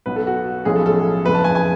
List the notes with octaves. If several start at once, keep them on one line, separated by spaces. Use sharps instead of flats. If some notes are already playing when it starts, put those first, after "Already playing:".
B1 B2 F#3 B3 B4
A4
F#4
B1 A2 F3 G#3 C#4 G#4
A4
A4
F#1 F2 C#3 G#3 B4
A5
G#5
G#5